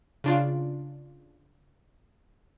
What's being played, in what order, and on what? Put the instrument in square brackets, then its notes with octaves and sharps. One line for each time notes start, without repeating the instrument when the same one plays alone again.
[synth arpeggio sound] C#3 D4 F4